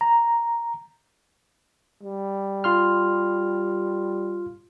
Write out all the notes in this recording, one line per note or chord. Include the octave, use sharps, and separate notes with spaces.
A#5
G3
F4 C6 F6